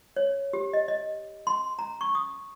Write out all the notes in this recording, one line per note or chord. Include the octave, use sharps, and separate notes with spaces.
C#5
G4
D#5
D#5
C6
A#5
C#6
D#6